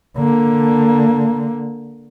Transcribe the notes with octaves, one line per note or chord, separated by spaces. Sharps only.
D3 A#3